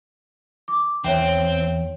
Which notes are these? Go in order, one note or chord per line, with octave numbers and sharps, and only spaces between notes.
D6
E2 C4 C#5 E5 G5